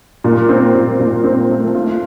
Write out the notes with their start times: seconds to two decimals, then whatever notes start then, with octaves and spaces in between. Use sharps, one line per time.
0.24 A#2
0.49 C4
0.74 A#2
1.00 A#2
1.24 C4
1.50 A3
1.75 F4